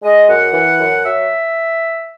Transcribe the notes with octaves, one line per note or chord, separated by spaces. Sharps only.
G#3 D#5
F#2 F#5
E3
F#2
F#3 E5